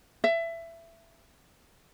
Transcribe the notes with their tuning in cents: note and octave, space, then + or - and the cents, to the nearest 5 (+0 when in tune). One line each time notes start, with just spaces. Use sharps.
E5 +20